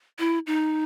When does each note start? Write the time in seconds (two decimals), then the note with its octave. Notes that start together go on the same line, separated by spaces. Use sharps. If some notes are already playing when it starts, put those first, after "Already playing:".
0.19 E4
0.47 D#4